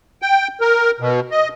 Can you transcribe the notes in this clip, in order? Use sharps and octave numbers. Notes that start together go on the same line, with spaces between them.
G5
A#4
B2
D#5